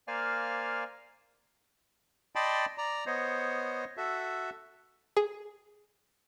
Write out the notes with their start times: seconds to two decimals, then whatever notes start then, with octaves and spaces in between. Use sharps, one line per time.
0.08 A#3 C5 D5 F5 G#5 F6
2.35 D5 D#5 G5 A5 B5 C6
2.78 D5 A#5
3.06 B3 C5 C#5 D#5
3.97 F#4 A4 E5
5.17 G#4